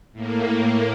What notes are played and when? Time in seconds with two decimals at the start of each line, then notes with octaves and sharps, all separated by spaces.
0.13 A2 A#3